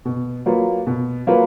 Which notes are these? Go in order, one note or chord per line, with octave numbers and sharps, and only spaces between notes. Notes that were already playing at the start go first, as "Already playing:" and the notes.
B2
F#3 A#3 F4 B4
B2
F#3 A#3 F4 B4